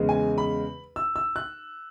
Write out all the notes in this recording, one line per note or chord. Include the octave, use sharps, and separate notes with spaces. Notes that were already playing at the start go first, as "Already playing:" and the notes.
Already playing: E2 C#3 G#3
G#5
B5
E6
E6
F#6